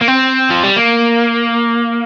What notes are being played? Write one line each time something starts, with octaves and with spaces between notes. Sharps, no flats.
A#3
C4
F3
G3
A#3